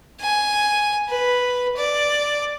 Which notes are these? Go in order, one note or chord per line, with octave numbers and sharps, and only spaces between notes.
G#5
B4
D5